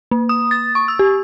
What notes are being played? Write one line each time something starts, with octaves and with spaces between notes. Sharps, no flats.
A#3
D#6
A6
C#6
E6
G4